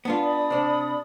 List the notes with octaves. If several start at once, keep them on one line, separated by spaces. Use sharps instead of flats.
B3 D4 F4
D5 B5 D#6
C3 D4